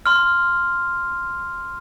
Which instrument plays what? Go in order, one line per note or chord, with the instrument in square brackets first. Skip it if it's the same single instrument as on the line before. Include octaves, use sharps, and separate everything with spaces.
[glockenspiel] C6 F6